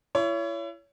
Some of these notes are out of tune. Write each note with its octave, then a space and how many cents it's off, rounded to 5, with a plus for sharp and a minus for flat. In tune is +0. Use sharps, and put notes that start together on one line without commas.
E4 +35 C#5 +25